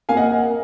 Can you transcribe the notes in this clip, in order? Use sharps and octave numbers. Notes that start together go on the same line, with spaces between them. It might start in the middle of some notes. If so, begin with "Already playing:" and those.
A#3 F5 G#5
D#5 F#5